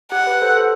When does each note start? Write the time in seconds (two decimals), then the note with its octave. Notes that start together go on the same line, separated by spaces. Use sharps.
0.12 G4 F#5
0.27 G4 B4
0.42 A4 C5
0.57 A4 C5